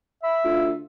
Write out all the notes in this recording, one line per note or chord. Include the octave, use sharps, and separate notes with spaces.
E5 B5
D2 F4